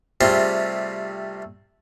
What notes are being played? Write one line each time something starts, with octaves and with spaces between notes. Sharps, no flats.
C3 G3 A3 C4 F4 G#4